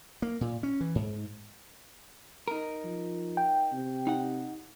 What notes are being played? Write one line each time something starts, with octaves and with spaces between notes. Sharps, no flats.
A#3
A#2
C#4
E3
G#2
D#4 A#4
F3
G5
C3
D#4 F#5